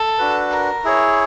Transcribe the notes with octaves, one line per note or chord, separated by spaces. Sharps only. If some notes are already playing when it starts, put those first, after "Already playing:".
Already playing: A4
D4 F#4 B4
A#4
E4 G#4 C#5